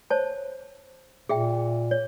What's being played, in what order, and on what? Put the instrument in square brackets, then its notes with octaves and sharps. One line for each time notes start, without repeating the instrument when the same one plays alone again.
[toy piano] C5 C#5 A5
[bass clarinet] A#2 [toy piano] G#4 E5 G5
[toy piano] C#5